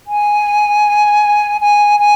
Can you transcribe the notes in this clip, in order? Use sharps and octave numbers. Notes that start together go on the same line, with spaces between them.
G#5
G#5
G#5